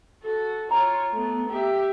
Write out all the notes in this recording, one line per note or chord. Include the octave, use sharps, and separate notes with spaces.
F#4 A4
F4 C#5 A#5
A3 B3
G4 E5